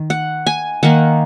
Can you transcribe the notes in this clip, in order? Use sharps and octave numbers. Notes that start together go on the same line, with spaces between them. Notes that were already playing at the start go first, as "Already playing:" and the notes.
Already playing: D#3
F#5
G#5
D#3 A#3 D#4 F#5